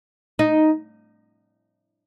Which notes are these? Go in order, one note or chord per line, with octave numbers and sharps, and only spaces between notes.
D#4